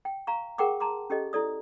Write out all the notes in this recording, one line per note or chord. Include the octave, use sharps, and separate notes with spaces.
G5
F5 A#5 C#6
G#4 A#4 F#5 G5 C#6 D6
A5 A#5 C6 D6
C#4 G4 A4 D#5
E4 A4 D5 D#6